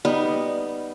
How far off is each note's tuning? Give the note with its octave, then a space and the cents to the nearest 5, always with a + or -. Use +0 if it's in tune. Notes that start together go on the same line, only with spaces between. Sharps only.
G3 +0 B3 +0 D#4 +0